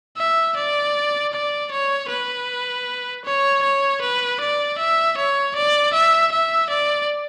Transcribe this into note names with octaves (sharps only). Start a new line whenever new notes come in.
E5
D5
D5
C#5
B4
C#5
C#5
B4
D5
E5
C#5
D5
E5
E5
D5